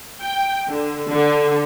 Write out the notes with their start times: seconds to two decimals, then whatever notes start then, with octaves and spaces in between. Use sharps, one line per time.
0.20 G5
0.68 D3
1.08 D3